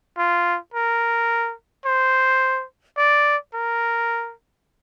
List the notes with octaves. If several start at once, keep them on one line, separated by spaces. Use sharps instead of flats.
F4
A#4
C5
D5
A#4